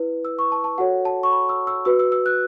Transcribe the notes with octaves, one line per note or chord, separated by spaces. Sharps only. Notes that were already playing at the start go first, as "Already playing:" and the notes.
Already playing: E4 B4
E6
C#6
A5
A5
F#4 A4 C#5 F#5
A5
C#6
B5
E6
E6
F#4 B4 E6
E6
E6
F#6